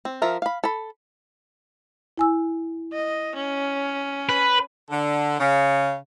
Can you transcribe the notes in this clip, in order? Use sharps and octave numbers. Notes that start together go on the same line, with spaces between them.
C4
F3 F4 A#4 E5
F5 B5
A4 B5
E4 G#5 E6
D#5
C#4
B4
D3
C#3